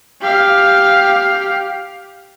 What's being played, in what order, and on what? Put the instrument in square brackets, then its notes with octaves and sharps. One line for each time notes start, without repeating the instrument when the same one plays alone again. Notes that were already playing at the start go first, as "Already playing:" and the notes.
[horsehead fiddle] G4 F5